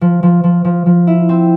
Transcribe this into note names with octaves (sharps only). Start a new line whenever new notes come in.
F3
F3
F3
F3
F3
E4
C4